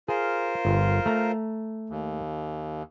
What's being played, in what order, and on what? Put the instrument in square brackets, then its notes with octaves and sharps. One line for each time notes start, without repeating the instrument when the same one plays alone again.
[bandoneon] F4 A#4 C5 [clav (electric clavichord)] G#4
[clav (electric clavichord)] G1
A3 A#5
[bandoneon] D#2